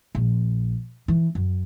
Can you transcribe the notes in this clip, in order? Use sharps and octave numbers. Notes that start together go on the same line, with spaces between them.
A#1
E3
F#2